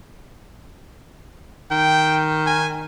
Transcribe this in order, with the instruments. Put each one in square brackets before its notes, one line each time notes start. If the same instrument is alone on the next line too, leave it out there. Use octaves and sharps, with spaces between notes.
[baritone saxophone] D#3 [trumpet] G5
[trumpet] G#5